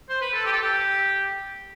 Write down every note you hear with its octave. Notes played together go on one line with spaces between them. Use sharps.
C5
B4
A4
G4
A4
G4